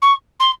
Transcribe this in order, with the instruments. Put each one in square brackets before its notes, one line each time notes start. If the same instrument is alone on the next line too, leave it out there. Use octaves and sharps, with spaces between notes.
[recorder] C#6
C6